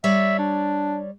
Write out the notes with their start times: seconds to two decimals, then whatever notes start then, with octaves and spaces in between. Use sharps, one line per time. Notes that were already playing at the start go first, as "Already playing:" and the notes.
0.04 G3 C#5 D5 E5
0.39 D4